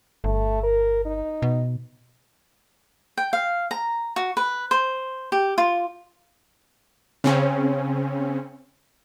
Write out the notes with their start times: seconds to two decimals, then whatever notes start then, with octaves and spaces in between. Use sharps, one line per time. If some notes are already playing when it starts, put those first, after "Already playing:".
0.24 G1 A3
0.63 A#4
1.05 D#4
1.42 B2
3.17 G5
3.33 F5
3.71 A#5
4.16 F#4
4.37 B4
4.71 C5
5.32 G4
5.58 F4
7.24 C#3 C4 C#4